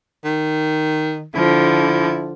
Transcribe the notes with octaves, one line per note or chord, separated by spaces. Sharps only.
D#3
D3 F3 E4